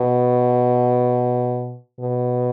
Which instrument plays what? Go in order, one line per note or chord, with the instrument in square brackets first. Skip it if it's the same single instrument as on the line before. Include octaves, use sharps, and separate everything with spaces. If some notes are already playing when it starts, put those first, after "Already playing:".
Already playing: [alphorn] B2
B2